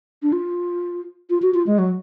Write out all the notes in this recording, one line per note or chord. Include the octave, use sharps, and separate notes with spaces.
D4
F4
F4
F#4
F4
G#3
F#3